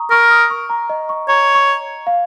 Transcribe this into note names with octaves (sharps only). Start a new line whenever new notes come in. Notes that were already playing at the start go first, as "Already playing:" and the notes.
Already playing: A#5 C#6 D#6
A#4 C#6
D#6
C#6
A#5
D#5
C#6
C#5 A#5
C#6
F5